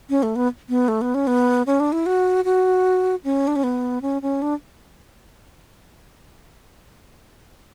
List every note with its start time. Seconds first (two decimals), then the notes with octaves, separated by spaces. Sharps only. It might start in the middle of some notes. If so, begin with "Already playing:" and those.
0.10 C#4
0.23 A3
0.36 B3
0.69 B3
0.88 A3
1.01 B3
1.14 C#4
1.27 B3
1.66 C#4
1.80 D4
1.92 E4
2.06 F#4
2.45 F#4
3.24 C#4
3.47 D4
3.56 C#4
3.63 B3
4.02 C#4
4.22 C#4
4.42 D4